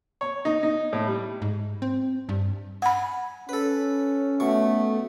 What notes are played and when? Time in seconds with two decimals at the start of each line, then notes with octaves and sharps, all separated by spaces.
0.21 C#5
0.45 D#4
0.63 D#4
0.93 A2
1.07 G3
1.42 G#2
1.82 C4
2.29 G2
2.82 F#5 G#5 B5
3.49 C#4 A4 B4
4.40 B2 A3 C#6